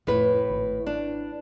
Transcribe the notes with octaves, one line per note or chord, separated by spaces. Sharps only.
F1 A2 B4
G#1
D4